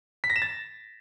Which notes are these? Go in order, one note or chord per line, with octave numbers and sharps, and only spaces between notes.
B6
A#6
E7
A6